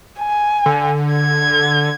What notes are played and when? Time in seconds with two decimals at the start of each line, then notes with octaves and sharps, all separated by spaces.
0.21 G#5
0.66 D3
1.13 G#6